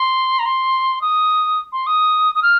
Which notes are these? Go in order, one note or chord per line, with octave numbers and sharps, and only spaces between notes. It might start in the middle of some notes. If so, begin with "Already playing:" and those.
Already playing: C6
A#5
C6
D#6
C6
D#6
D#6
F6